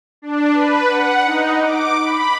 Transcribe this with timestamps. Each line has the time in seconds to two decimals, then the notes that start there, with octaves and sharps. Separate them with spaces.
0.22 D4
0.53 B4
0.87 F#5
1.25 D#4
1.60 D6
2.01 B5